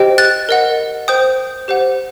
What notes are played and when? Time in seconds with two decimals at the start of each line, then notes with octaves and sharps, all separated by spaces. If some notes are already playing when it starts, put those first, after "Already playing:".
Already playing: G4 C5 D#5 G5
0.18 F#6 A6
0.49 A#4 D#5 F#5
1.08 C5 G5 D#6 G6
1.68 G4 C5 F#5